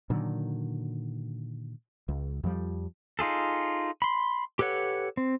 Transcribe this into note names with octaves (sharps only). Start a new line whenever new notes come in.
A#2 D3 D#3 F#3
C#2
F2 F3 G3
D#4 F4 G#4 A4
B5 C6
G4 A4 B4 C#5 F#5
C4